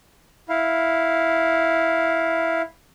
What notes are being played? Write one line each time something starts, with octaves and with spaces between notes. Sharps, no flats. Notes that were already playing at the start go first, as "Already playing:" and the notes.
E4 F5